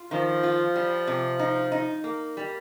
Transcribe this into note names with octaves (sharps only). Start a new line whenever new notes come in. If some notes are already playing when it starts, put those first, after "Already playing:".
Already playing: F4
D#3 F3
F4
G3
C3
D#4
D#4
A#3
G3